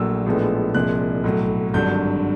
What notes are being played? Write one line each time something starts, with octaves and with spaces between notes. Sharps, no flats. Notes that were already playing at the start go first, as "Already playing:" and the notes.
Already playing: A#1 A#2 F#3 A3 E6
A#1 A2 F3 G#3 B3
C2 A#2 F3 G#3 F#6
B1 A2 F#3
G#1 G2 D3 F#3 G6